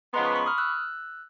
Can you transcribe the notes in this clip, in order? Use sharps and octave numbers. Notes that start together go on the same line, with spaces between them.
C#3 F3 G#3 B3 A#5 C6
B5 C#6
B5 C#6
D#6 F6
E6 F#6